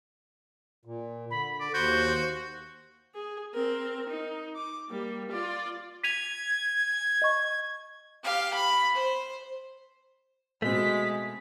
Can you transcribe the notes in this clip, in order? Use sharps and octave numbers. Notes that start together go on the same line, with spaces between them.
A#2
D3 B5
D5
D#2 F#4 C5 G6
G#4
C4 A#4
D#4
D6
G3 A#3
F4 D5
G#6 B6 D#7 F7
D#5 C#6
G4 F5
B5
C5
B2 G#3 A3 C4 B6